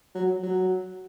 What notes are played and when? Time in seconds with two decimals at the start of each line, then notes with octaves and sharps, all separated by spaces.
0.15 F#3
0.43 F#3